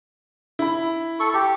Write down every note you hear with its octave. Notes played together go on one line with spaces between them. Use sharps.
E4 B5
A4 C#6
G4 A5